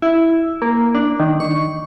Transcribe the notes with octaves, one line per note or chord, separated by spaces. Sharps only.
E4
A#3
D4
D#3
C#6